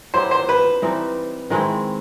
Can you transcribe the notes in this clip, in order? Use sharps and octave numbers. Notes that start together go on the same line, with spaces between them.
F#3 B3 E4 G4 C5
C5
B4
E3 G3 C4 D#4
D#3 G#3 C4 E4